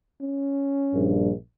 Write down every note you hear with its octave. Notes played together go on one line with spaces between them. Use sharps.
C#4
A#1 G2